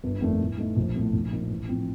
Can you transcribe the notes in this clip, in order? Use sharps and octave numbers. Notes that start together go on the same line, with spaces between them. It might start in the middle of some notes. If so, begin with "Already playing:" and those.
G1
F2 D#3 A3 D4
A2
A3 D#4
A#1
A2 A3
A#1
A#2 F3 A#3 D#4
A1
A2 F3 C4